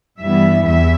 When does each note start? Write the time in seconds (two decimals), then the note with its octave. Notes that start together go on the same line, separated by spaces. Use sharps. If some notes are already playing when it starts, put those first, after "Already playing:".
0.20 G2 E3 G3 B3 E5
0.66 E2 E5